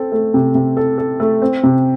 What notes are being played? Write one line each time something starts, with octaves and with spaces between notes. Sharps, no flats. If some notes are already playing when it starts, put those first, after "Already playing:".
Already playing: C4 A4
A3
C3
C3
A4
A4
A3
C4
C3